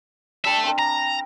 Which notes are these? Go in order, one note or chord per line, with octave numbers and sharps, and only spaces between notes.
G3 D4 E5 A5
C4 D4 A#4
A#5